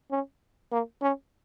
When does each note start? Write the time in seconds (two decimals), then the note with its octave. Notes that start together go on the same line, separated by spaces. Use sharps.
0.11 C#4
0.72 A#3
1.02 C#4